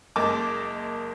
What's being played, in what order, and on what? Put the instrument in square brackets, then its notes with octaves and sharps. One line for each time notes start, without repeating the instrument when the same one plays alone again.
[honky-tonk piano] F#1 G#3 A#3 D#5 A5 D6